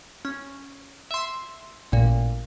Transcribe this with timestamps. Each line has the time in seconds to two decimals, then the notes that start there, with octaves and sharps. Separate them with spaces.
0.25 C#4
1.11 E5 C6
1.92 A1 A#2